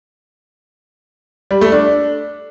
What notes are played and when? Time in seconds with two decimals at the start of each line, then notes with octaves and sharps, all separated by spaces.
1.51 G3
1.61 A3
1.72 D4